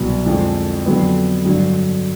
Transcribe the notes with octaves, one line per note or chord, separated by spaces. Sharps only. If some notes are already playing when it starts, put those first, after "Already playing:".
Already playing: C2 B2 F#3
F2 D3 F3 G#3
F2 D3 F#3 B3
G2 D3 F#3